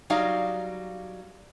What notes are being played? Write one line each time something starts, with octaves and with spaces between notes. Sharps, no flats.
F#3 G3 D#4 D5 F5